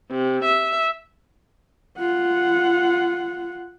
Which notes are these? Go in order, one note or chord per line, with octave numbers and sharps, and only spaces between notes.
C3
E5
F4 F#5